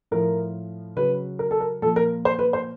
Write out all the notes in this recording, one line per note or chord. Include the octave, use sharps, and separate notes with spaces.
A2 F3 A#4
C#3 F#3 B4
A#4
A4
A#4
A#2 F3 A4
A#4
C5
B4
C5